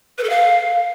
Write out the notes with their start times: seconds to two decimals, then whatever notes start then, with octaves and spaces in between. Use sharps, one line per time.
0.18 B4
0.24 A4
0.30 F5